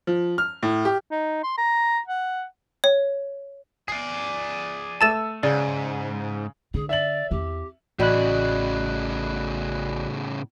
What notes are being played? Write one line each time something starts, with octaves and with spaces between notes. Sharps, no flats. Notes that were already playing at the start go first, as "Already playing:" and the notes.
F3
F6
A2
G4
D#4
C6
A#5
F#5
C#5
G#4 D5 C7
A3 A5 E6 A6 D#7 E7
G#2 C#3 D5
D3 G#4
D5 E5 F#7
E2 C4 G4
A1 A2 C#3 F#4 D5 D#5 B5 F#6